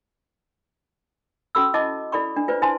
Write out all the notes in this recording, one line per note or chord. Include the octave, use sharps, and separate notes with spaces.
C#4 F#4 A4 B5 E6
E4 D#5 A5 D6
E4 A4 D5 B5 C#6
D4
F4 B4 C5 D5
E4 C5 G#5 A5 C6